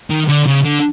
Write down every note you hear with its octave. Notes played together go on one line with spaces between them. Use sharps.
D#3
D3
C#3
D3